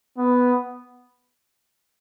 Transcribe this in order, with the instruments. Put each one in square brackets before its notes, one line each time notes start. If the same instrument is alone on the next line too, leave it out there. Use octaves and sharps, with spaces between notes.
[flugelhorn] B3